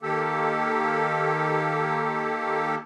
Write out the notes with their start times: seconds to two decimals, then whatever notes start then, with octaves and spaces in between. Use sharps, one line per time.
0.02 D#3 A#3 G4 A4